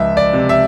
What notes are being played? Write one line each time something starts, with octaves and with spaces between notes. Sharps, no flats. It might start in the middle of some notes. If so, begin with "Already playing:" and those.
Already playing: C#2 F3 E5
D5
C3
E5